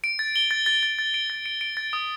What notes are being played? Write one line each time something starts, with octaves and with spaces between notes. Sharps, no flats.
D7
A6
G7
A6
A6
A6
A6
D7
A6
D7
D7
A6
D#6